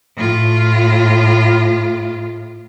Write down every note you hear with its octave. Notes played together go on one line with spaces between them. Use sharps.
A2 F4